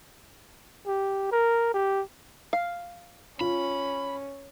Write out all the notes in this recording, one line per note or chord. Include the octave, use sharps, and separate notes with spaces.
G4
A#4
G4
F5
C#4 F4 B5